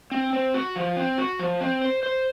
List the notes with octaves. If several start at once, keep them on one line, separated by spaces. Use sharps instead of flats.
C4
C4
F#4
F3
C4
F#4
F3
C4
C5
C5